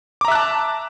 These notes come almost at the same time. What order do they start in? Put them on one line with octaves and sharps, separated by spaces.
D6 A#5 E5 F#6 A5